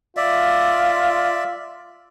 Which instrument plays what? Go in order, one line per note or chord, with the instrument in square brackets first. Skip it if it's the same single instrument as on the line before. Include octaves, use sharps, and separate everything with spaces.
[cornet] F4 [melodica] D5 E5